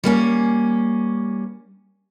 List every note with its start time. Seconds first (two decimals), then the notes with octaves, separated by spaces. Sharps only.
0.04 G3 A#3 C#4